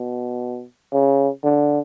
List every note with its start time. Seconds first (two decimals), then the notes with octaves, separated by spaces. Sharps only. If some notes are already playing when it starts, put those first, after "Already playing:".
Already playing: B2
0.93 C#3
1.44 D3